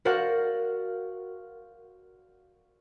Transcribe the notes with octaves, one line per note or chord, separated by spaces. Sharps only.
F#4 A#4 C5 D5 F5 F#5